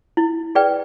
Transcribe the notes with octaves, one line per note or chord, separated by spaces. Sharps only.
E4
G#4 B4 D5 G5